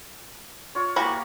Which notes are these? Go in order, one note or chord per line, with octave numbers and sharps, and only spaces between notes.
F4 C#5
E3 A#3 F#4 G4 A#4 B5